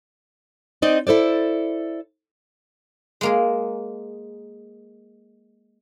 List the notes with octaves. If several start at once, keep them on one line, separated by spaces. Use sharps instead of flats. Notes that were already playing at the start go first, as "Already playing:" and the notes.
C4 D#4 D5 D#5
E4 A4 C5 D5
G#3 A#3 G#4